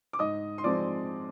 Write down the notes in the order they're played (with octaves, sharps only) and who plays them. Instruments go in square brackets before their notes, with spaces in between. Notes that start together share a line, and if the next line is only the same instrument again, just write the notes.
[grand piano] D6
G#2 D#5 D#6
C6
F3 G#3 C4 D5 D6